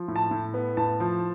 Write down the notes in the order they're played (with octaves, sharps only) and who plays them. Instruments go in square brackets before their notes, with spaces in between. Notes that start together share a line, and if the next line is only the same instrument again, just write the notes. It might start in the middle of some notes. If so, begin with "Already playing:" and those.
Already playing: [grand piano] F3
A2
A5
A2
B3
A2 A5
F3